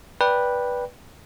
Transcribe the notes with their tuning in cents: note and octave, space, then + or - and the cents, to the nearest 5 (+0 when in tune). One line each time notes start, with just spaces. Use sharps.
B4 -10 D5 +0 G5 +0